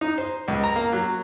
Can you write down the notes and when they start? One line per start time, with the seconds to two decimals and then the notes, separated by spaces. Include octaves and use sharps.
0.01 D#4
0.18 C5
0.48 C#2
0.64 A#5
0.76 A#3
0.92 F#3